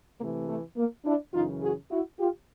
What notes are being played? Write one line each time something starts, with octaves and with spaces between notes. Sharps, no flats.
C3 E3 A3 A#3
A3
A#3
D4 E4
F#2 C#3 E3 D#4 F4
F#4 G#4
E4 F#4
F4 G4